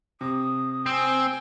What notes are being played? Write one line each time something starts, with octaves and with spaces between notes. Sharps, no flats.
C3 D#6
C4 G5 G#5